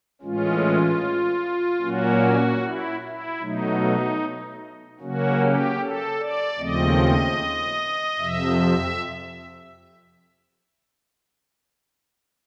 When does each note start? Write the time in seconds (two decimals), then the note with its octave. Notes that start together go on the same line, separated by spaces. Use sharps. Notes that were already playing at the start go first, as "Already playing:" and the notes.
0.22 A2 E3 G#3 C#4 F4
1.81 A#2 F#3 A#3 C#4 F#4
2.61 E4
3.01 E4
3.41 B2 F#3 A3 D#4
5.00 C#3 F#3 A#3 C#4 F#4
5.39 G4
5.79 A4
6.20 D5
6.59 D#2 C#3 F3 A3 C4 D#5
8.19 F2 C3 F3 E5